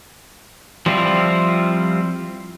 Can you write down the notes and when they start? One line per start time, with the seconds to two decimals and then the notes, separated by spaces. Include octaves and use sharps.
0.86 F3 G3 C4 E4 F4